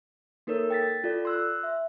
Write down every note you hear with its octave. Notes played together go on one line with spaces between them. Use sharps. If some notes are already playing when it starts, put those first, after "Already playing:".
A#3 D#4 A4 A#4 C#5 E6
G5 A6 B6
F4 A4 D5
C6 E6 F#6
E5